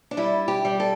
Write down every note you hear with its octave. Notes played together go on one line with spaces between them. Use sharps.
D4
G3 E4
G4
G3
A4